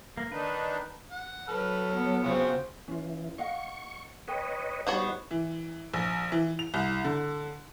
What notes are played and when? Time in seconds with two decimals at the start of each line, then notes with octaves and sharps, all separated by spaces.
0.17 A#3
0.32 D#3 D4 D#4 B4
1.12 F#5
1.48 F#3 A4 B4 F6
1.93 B3
2.24 C#3 C4 F4 F#4 G#4
2.88 E3 C#4 F4
3.38 D#5 F5 F#5 C#6
4.28 A#4 B4 C#5 D#5 G5
4.87 G3 B3 D#4 F#4 C5 C#5
5.31 E3
5.94 A#1
6.32 E3
6.59 F7
6.74 C2
7.04 D3